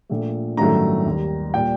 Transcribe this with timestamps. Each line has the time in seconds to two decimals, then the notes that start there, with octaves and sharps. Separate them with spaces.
0.09 A#1 A#2 A3
0.57 A1 G2 D#3 F#3 A3 A#5
1.06 D#2 D#3 G3
1.54 A#2 G3 G5